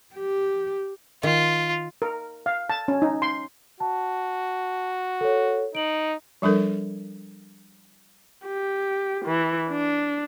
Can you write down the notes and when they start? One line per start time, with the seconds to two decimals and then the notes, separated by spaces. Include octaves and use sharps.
0.15 G4
1.23 D#3 F4
2.02 A#4
2.46 F5
2.70 A5
2.88 C#4
3.02 D#4
3.22 C6
3.80 F#4 A5
5.21 A4 C#5
5.75 D#4 D7 F#7
6.42 F3 G3 D4 A4 A#4
8.46 G4
9.26 E3
9.69 D4